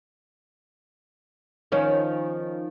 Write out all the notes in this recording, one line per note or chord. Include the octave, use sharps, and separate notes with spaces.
D#3 F3 C#4